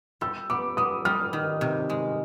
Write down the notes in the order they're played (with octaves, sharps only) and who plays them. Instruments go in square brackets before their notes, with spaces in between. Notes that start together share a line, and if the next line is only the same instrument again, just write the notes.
[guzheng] G3 [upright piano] E6
[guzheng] B3 [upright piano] D6
[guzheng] B3 [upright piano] D#6
[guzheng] G3 [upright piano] F6
[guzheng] D#3
C3
G#3